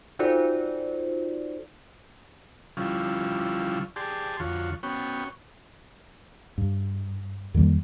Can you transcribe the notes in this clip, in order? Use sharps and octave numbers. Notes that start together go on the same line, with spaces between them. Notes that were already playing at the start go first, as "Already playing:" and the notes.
D#4 F4 F#4 A4 C5 D5
D3 F3 G3 C#4 E4 F4
G4 G#4 D5 A5 C6
F2 D3 F4 F#4 C#5
B3 C#4 F#4 C#5 G5
G2
F2 D#3 G3 A#3